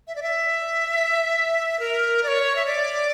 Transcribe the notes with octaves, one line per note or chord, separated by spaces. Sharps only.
E5
D5
E5
A#4
D5
C#5
E5
D5